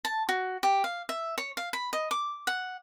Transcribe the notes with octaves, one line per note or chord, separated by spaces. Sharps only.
A5
F#4
G4
F5
E5
C#5
F5
B5
D#5
D6
F#5